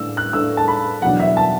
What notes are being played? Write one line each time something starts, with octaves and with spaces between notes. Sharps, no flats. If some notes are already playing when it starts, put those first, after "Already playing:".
Already playing: A2 A3 D4 E6
F#6
A2 A3 D4 E6
A5
B5
E2 B2 F#3 D4 F#5
E5
A5